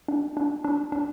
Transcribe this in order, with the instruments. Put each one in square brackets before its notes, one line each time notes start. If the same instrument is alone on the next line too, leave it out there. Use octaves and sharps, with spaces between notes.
[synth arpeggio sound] D4
D4
D4
D4